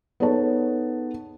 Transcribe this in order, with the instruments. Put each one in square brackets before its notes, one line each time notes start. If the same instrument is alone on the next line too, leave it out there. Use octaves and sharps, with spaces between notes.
[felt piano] B3 D#4 G#4 A4 C#5 A5